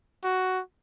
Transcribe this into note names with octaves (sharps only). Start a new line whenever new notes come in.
F#4